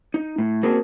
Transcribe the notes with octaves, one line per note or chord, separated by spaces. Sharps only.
D#4
A2
A#3 C4 F#4 G#4 A#4 A5